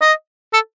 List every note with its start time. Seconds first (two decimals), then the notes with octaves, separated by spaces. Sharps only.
0.02 D#5
0.53 A4